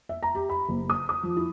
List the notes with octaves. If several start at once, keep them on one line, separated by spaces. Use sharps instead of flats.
E5
A#5
G4
B5
F#1
D#6
D#6
F3
E4